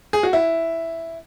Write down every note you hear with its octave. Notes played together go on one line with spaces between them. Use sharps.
G#4
F#4
E4